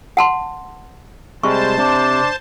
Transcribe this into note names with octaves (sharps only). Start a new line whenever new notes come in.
F#5 A5 C6
C3 G3 G#3 C5 A5 C#6
C3 D4